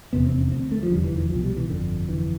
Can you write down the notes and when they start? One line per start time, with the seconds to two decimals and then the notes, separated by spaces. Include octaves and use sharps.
0.13 F1 E2 C3 B3
0.26 C4
0.38 C4
0.52 D2 D3 C4
0.72 A3
0.83 F3
0.91 F1 E2 D3 G3
1.04 E3
1.18 E3
1.30 C2 F3
1.35 B2
1.44 G3
1.56 E3
1.70 G1 F2 D3
2.08 G1 F2 D3 E3